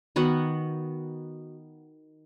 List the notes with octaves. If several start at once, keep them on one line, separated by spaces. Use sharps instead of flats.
D#3 B3 F#4 F#5